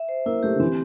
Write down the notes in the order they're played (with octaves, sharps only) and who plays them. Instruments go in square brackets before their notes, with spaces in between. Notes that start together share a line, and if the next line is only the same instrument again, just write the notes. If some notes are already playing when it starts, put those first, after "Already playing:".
Already playing: [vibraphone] E5
C5
[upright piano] A#3 [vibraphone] E4
[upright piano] A3 [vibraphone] G4
[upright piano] D3
[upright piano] E3 [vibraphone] C4